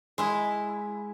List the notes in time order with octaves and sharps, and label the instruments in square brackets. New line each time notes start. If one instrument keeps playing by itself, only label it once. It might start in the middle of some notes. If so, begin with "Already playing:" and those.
[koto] G#3 E4